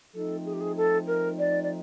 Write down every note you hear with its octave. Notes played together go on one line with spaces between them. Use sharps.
F3 A3 C4 D#4 A4
G#4
G4
G#4
A4
A#4
D5
D5